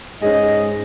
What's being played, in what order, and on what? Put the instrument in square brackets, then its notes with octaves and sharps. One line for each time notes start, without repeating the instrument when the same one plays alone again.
[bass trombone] G#2 [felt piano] C#4 G#4 [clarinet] D#5